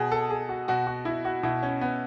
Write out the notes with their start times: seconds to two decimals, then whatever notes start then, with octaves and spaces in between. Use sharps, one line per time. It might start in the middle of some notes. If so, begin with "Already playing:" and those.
Already playing: B2 G#4
0.12 A4
0.30 G#4
0.49 F#4
0.68 B2 F#4
0.87 F#4
1.05 E4
1.25 F#4
1.43 B2 E4
1.63 C#4
1.81 B3